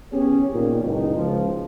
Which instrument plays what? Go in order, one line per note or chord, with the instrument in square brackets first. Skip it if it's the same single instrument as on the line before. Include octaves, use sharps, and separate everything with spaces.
[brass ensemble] F#1 B3 C#4 G4 G#4 C#5
A#2 D#3
F#1 C#2 D#4
C#2 F3